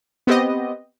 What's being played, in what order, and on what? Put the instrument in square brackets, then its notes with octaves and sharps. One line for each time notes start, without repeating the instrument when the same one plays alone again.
[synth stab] B3 C4 G4 D#5